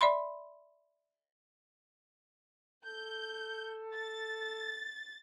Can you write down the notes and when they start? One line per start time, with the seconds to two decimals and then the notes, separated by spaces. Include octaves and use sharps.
0.01 D5 E5 B5 C6
2.85 A4 G6
3.94 A6